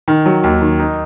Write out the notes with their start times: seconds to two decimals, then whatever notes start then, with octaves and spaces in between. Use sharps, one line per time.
0.08 D#3
0.26 F#3
0.44 D#2
0.61 D#3
0.80 D#4